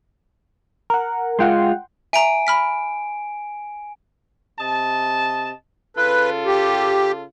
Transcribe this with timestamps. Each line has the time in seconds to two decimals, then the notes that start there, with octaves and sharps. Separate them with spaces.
0.90 A#4 F#5
1.39 G#3 F4 F#5 G5 C6
2.13 E5 G#5 A#5 D7
2.47 B5 F6 B6
4.60 C3 D#5 A5
5.97 C#3 F4 A4 B4
6.46 G4